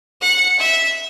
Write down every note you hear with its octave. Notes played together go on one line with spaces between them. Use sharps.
F#5
E5